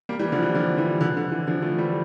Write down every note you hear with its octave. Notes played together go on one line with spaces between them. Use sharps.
G3 A#3
E3 G3
D3 F3
E3
D3 F3
E3 G3
D3 F3
D3
E3
D3 F3
F3 A3
E3 G3